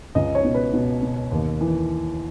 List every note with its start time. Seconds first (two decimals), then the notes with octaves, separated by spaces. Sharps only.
0.15 C#2 D#5
0.35 C#5
0.44 B2
0.54 B4
0.73 B2
1.02 B2
1.32 D#2
1.61 E3